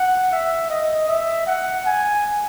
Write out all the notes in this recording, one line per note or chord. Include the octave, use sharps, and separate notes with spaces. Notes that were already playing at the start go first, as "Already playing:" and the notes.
Already playing: F#5
E5
D#5
E5
F#5
G#5